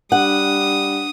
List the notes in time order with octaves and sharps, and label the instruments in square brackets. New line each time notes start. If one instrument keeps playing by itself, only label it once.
[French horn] G3 [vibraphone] D4 [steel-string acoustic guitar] F#5 [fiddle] D#6